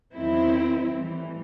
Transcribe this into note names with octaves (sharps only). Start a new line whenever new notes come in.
E2 D#3 F#3 C4 E4
A2 E3 G3